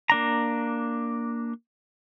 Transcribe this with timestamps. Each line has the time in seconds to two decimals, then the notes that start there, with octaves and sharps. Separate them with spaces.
0.10 A#3 D4 A#5